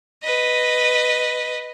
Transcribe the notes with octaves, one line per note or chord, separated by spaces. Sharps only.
B4 D#5